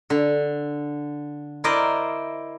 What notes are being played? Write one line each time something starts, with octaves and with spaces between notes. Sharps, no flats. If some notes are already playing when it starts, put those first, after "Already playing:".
D3
E4 A#4 C5 D5 D#5